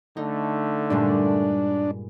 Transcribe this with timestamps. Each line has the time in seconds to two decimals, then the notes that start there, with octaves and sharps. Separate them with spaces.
0.17 D3 A3 D#4
0.90 G2 A#2 G#3 D4